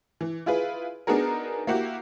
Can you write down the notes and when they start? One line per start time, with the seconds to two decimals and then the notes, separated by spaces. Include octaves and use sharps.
0.21 E3
0.46 E4 F4 G#4 B4
1.07 B3 D4 D#4 F#4 G#4 A#4
1.67 A#3 E4 F#4 G4